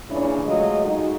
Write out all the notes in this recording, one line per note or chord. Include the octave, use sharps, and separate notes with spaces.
A#2 C#3 E3 C#4 D4 E4
F#3 G#3 A3 F4 D#5
G#3 D#4 F#4